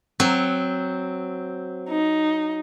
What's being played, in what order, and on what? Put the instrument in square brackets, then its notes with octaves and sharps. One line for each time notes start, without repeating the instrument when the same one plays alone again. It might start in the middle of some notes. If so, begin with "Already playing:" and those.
[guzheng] F#3 [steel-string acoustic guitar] C4
[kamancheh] D#4